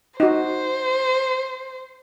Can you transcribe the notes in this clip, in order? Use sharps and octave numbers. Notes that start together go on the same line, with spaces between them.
D#4 F#4 C5